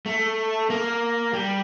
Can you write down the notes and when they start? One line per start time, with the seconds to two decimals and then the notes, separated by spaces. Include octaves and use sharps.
0.06 A3
0.70 A#3
1.33 G3